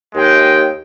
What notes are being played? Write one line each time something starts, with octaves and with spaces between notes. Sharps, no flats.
D#2 G#3 G5